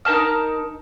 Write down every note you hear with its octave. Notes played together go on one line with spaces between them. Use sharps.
D#4 A#4 A5 F6